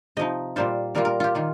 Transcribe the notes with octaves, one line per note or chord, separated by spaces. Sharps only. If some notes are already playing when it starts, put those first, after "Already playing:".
C3 F3 D#4 D#5
A#2 G3 A#3 F4 C5
A#2 G3 A#3 F4 A#4
A#4
F4 G4
D#3 A#3 F4